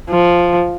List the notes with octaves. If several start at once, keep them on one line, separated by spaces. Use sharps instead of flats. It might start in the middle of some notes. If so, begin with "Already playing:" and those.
F3